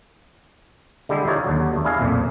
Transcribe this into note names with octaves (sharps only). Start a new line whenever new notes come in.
D3 G3 G#3 E4 G4
D#4 F4 A4 C#5 D5
D#2 D3 F#3
E2 A3
D4 E4 G#4 D#5 F5 G#5
B1 F2 A#2